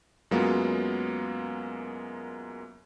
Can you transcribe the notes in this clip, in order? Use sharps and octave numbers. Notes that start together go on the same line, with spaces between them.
F#2 F#3 G#3 A#3 B3 F4